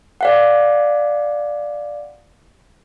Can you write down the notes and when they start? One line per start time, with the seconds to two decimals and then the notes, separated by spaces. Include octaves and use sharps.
0.21 D5 F5 F#5